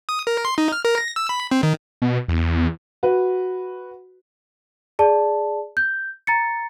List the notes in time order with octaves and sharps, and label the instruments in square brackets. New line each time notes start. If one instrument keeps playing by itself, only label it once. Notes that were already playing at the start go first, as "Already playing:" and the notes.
[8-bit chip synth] D#6
A#4
C6
D#4
F6
A#4
A#6
E6
B5
C4
D#3
[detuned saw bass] B2
E2
[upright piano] F#4 B4
[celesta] G#4 D5 A5
G6
A#5 A6 C#7